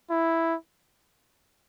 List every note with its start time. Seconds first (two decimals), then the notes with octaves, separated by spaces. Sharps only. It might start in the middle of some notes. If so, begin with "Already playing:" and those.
0.10 E4